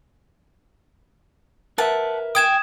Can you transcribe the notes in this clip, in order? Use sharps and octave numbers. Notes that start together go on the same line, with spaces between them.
A#4 B4 E5 F#5 A5
G5 G#5 D#6 G#6 E7